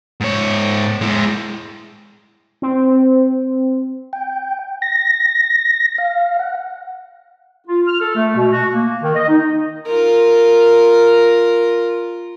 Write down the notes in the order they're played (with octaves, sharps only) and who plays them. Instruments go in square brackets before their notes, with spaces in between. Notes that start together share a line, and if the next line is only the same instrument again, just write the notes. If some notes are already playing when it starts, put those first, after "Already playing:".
[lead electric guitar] G#2 C#5
G#3 E4
[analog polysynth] C4
[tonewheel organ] G5
A#6
F5
F#5
[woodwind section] F4
F6
A4
A3
B2
F#4
A#3
D#3
D#5
D#4
[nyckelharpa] F4 A#4